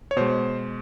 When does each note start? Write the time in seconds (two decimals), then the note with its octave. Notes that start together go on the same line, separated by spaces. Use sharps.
0.11 C#5
0.16 B2 G#3 C5